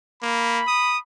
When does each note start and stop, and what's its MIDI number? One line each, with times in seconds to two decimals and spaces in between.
0.23 0.62 58
0.23 1.00 83
0.68 0.98 87